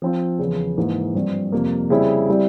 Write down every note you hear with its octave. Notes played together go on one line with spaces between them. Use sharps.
F3 C4 F4
E2 C#3 F3
G#2 E3 A#3
G2 F3 C4
F2 C3 F3 A#3
C#3 G3 C4 E4
G3 C4 E4